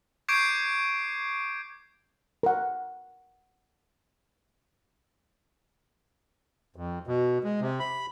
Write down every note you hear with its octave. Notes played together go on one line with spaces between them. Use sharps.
C#6 D6 G6 G#6 C7 D7
A#4 F#5
F2
B2
G#3
C3
B5